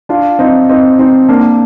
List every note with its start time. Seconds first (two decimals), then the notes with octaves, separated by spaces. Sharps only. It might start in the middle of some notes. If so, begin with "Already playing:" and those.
0.09 D4 F4
0.39 C4 D#4
0.69 C4 D#4
0.99 C4 D#4
1.29 A#3 D4